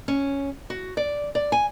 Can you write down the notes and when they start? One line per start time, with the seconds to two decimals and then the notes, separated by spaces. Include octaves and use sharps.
0.08 C#4
0.70 F#4
0.97 D5
1.35 D5
1.52 G#5